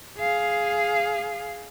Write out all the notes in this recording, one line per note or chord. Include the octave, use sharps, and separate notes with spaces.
G#4 F5